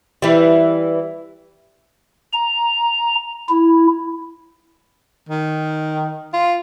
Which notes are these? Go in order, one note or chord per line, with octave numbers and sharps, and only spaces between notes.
E3 G3
A#5
E4
D#3
F4